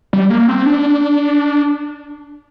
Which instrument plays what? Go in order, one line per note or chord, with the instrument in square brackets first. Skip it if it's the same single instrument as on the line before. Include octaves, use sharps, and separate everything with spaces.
[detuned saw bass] G3
A#3
C4
D4